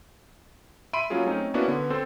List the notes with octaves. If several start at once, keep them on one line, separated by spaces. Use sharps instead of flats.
E5 B5 C6 D7 D#7
F#3 A#3 C#4 F4 G#4
A3 C4 C#4 D#4
A#3 B3 C#4 D4 E4 F#4
D3 B3
C4 A4 C5